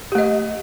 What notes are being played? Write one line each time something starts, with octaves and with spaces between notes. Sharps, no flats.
A3 G4 D#5